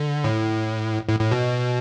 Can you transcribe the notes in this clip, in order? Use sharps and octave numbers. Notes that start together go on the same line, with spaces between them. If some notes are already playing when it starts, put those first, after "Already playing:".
Already playing: D3
A2
A2
A2
B2